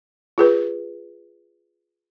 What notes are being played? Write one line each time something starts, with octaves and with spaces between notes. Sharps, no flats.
F4 G#4 B4